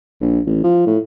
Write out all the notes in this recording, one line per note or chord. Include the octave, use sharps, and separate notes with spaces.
A#1
A1
F3
A2